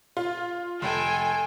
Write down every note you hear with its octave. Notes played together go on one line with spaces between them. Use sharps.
F4
F1 A4 G5 G#5